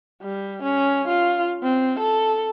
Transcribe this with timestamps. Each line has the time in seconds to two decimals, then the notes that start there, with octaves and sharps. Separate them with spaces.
0.22 G3
0.63 C#4
1.08 F4
1.63 C4
2.00 A4